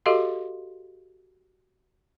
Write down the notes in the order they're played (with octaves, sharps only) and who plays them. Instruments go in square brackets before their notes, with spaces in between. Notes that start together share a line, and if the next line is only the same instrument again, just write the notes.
[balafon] F#4 G4 A4 D#5 F5 C6